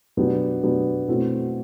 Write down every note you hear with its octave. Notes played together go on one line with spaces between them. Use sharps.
B2 F#3 B3 D4 G4
B2 F#3 B3 D4 G4
B2 A3 C4 E4